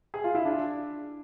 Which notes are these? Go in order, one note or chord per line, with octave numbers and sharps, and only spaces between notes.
G#4
F4
E4
D4